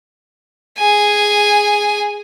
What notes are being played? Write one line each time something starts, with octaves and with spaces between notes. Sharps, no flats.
G#4 G#5